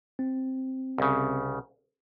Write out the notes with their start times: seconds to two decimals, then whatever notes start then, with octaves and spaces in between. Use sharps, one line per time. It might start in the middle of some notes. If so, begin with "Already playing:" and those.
0.19 C4
0.98 C2 C#3